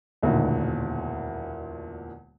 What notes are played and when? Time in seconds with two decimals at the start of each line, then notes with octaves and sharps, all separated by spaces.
0.22 E1 D2 A#2 D#3